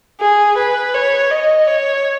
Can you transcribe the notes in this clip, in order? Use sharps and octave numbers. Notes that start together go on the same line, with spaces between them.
G#4
B4
C#5
D#5
C#5